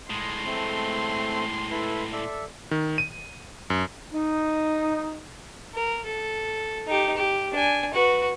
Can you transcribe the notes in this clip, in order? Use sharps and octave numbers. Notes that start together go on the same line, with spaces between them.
A2 G#3 C6 D#6
A3 C4
E4 A4 B4
A4 D5 E5
D#3
D#7
F#2
D#4
A#4
A4
D#4 G4
G4
D4 G#5
F#4 B4